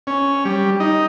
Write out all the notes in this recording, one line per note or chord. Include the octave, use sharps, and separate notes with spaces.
C#4
G3
D#4